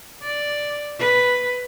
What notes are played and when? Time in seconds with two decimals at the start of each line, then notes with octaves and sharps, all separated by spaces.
0.22 D5
0.98 B4